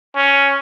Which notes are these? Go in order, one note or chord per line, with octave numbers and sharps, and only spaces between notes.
C#4